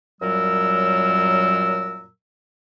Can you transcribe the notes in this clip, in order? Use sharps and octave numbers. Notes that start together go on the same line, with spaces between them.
F#2 A#2 F#3 G3 A#4 E6